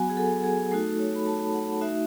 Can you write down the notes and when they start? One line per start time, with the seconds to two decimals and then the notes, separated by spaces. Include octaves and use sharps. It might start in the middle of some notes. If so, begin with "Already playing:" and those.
Already playing: F#3 B3 F#4 F#5 G#5
0.10 G#4
0.17 A4
0.44 G#4
0.71 A3 D#4 F#4 A4
0.99 C#5
1.15 B5
1.26 A5
1.54 F#5
1.81 A3 D#4 F#4 E5